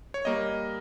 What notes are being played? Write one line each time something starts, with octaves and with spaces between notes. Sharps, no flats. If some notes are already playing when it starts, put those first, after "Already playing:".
C#5
G3 A#3 D#5